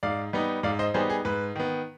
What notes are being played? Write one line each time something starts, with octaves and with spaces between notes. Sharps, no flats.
G#2 D5 F5
G3 B3 D#4
G#2 D5 F5
C5 D#5
G3 B3 D#4 G#4 C5
G#4
G#2 B4
D#3 B3